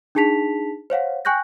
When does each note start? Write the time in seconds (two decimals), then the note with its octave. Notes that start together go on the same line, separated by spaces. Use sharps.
0.15 D4 D#4 G#4 A5 B6 F7
0.90 C5 C#5 F5 F#5
1.25 G5 G#5 C#6 F#6 G6 A#6